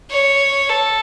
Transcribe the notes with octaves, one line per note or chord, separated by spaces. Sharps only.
C#5
A4